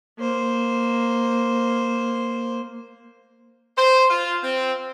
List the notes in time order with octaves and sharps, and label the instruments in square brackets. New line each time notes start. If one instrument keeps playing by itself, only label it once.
[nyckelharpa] A#3 C5
[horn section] C5
F4
C4